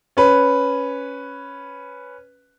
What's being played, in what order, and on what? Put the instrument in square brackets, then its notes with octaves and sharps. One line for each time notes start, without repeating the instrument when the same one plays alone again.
[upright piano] C#4 B4